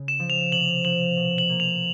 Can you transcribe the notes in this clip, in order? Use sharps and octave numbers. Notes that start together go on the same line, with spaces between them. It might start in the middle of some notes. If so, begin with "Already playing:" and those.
Already playing: C#3
E7
F3
F7
C3 F#7
F3 F#7
B2
F#7
A#3
F7